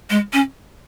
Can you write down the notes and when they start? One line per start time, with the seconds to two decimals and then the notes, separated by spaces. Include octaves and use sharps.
0.10 G#3
0.33 C#4